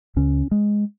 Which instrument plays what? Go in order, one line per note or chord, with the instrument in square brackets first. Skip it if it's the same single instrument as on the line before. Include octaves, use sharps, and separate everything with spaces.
[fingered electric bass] C#2 C#3 C#4
G#3